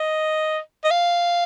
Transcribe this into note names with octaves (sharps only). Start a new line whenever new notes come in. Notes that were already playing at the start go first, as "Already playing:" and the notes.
Already playing: D#5
D#5
F5